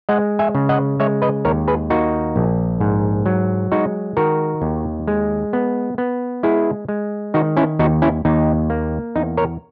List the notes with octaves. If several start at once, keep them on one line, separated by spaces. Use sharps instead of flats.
G#3 D#5 F#5
E5 G#5
C#3
D#5 F#5
G#3 C#5 E5
B4 D#5
D#2 A#4 C#5
G#4 B4
A#3 D#4 F#4
A#1
G#2
F#3
G#3 D#4 F#4
D#3 F#4 A#4
D#2
G#3
B3
B3
G#3 E4 G#4
G#3
D#3 D#4 F#4
C#4 E4
D#2 D#4 F#4
C#4 E4
D#2 D#4
A#3
E2 D#4
A#4 C#5